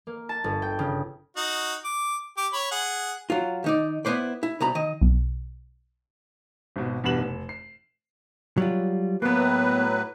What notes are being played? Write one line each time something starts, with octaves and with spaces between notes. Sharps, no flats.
A#3
A5
G1
G5
C#3
D#4 F#4
D6
G4 D6
C#5 B5
G#4 F#5
F#3 F4
D#3 D#4 D5
B3 E4 B4 C5 D5
E4
C2 B2 A#5 B5
D#3 D#5
B1
G#1 B2
E2 G2 B2 B4 E7 F#7
F1
C7
F#3 G3 F4
A2 F#3 A#3 B3 B4